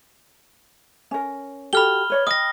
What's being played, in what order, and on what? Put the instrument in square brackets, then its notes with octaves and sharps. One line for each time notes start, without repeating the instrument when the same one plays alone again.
[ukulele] C#4 A#4
[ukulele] F#4 G4 A4 [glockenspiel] B5 F6 G7
[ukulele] B4 C#5 D5
[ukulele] D#5 G5 [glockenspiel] D#6 A#6